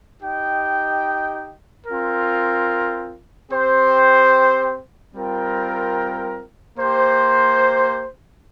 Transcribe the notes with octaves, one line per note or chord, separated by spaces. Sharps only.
D#4 G4 D#5 G5
C4 F4 A#4
C4 G4 C5
G3 C4 F4 A#4 G5
A#3 G4 C5